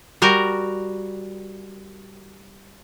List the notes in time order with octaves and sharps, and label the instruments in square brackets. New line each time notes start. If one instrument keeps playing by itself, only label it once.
[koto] G3 F#4 A#4